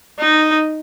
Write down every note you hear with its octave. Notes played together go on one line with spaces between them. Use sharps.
D#4